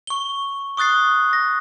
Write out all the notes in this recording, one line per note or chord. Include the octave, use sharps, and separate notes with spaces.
C#6 G7
C#6 D#6 F#6 A6 C7
A#6